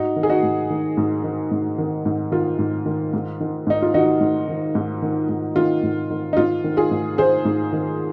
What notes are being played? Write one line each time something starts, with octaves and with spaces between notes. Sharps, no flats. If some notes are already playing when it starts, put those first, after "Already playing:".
Already playing: G#2 D#4 F#4
D#3
G#4
D#4 F#4
G#2
D#3
G#2
D#3
G#2
D#3
G#2
D#3 F4
G#2
D#3
G#2
D#3
G#2 D#4
F4
D#3 D#4 F#4
G#2
D#3
G#2
D#3
G#2
D#3 F4
G#2
D#3
D#4
G#2 F4
D#3
F4 G#4
G#2
D#3 G#4 C5
G#2
D#3